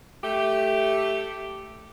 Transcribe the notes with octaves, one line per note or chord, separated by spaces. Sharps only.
A3 G4